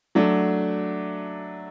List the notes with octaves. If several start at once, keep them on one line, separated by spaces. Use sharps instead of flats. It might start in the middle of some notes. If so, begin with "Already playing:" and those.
F#3 A3 D4